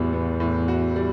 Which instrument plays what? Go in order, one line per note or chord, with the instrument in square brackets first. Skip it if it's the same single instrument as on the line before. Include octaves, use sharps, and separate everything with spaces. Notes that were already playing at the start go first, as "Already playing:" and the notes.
Already playing: [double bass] E2 [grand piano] A2 G3 B3 F#4
[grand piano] B3
A2
F#4
G3